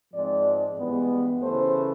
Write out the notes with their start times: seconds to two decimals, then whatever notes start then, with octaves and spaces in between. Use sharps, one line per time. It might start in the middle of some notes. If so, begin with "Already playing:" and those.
0.13 G#2 F3 G#3 C4 D5
0.78 G2 E3 G#3 B3
1.43 C#3 E3 A3 C5